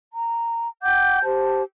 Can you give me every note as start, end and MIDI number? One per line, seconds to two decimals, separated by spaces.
0.11 0.67 82
0.82 1.22 78
0.82 1.22 79
0.82 1.22 86
0.82 1.22 91
1.23 1.62 67
1.23 1.62 72
1.23 1.62 81